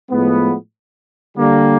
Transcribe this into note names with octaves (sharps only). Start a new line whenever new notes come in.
A2 F3 G#3 B3
D3 G3 A#3